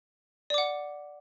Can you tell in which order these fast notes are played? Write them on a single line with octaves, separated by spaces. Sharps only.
D5 D6 F#5